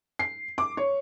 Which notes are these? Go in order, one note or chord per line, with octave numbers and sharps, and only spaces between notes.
C7
D6
C#5